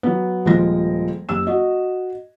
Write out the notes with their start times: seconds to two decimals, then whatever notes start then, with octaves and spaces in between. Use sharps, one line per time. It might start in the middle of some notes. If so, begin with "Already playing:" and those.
0.03 F#3 B3
0.46 D#1 F3 G#3 A#6
1.29 F#1 G4 E6 E7
1.47 F#4 D#5